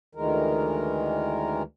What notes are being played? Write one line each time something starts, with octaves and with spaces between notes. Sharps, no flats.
D2 D#3 E3 G#3 A#4